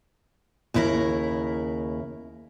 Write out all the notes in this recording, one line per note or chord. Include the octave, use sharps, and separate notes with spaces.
D#2 C#3 E4 G#4 A#4